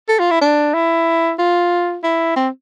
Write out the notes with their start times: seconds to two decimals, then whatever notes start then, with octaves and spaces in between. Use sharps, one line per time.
0.09 A4
0.19 F4
0.31 E4
0.41 D4
0.74 E4
1.39 F4
2.04 E4
2.36 C4